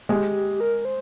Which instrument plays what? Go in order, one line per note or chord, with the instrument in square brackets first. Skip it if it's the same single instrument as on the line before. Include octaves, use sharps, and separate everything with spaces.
[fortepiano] G#3 [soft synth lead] G4
[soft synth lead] A#4
C5